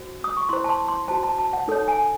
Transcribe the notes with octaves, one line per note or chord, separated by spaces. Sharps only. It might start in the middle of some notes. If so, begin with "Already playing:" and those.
Already playing: F#4 C5
D#6
C#6
E4 C5 C6
A5
C6
C6
F#4 C5 A5
A5
A5
F#5
D#4 A4 C#5
G#5